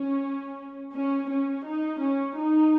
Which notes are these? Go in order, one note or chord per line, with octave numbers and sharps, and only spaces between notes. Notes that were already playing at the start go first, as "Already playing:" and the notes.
Already playing: C#4
C#4
C#4
D#4
C#4
D#4